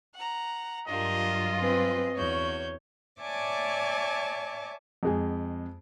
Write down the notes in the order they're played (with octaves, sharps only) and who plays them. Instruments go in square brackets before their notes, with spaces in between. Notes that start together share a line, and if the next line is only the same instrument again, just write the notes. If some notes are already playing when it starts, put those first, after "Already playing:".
[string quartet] F#5 A#5
[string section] G2 F#3 F4 [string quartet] D4 G4 A#4 [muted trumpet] D#5
[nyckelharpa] C4 B4 [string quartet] G#4 C6
[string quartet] E2 F#4 G6 [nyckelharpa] C#5
[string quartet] C#5 D5 E5 G#5 A5 D6
[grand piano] F2 G#3 G#5